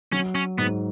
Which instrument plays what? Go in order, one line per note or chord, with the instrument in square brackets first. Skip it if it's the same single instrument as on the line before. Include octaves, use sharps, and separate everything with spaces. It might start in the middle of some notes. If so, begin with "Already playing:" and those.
[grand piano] F#3 [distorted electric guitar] C#4
[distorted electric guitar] C#4
[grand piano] G#2 [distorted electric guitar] B3